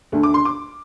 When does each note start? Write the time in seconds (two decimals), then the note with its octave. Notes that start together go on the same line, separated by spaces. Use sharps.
0.12 D2 D3 A3 D4
0.23 D6
0.34 C6
0.45 D6